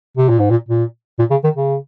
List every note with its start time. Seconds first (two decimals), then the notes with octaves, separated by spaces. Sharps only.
0.18 C3
0.29 A#2
0.40 G#2
0.50 A#2
0.69 A#2
1.19 A#2
1.31 C#3
1.44 D#3
1.57 C#3